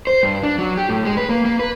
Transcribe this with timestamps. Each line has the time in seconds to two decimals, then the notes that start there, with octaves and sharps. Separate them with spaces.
0.07 C5
0.23 G2
0.43 D4
0.58 F#3
0.77 G4
0.89 A2
1.05 G#3
1.17 B4
1.29 A#3
1.45 A#3
1.59 B4